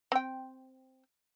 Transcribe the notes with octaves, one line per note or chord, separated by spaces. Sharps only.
C4 G5